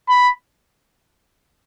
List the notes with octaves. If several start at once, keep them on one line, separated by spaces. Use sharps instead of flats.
B5